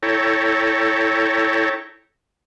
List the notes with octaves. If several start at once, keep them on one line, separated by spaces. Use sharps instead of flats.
E4 A4 C#5 G5 A#5